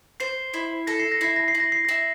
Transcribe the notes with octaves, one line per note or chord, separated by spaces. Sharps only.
C5 C7
E4
A4 A#6
C7
A#6
E4 C7
A#6
C7
E4
A#6
C7
E4 A#6